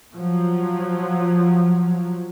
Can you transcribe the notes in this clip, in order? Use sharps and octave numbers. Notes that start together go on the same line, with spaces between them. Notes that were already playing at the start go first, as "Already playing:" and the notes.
F3 F#3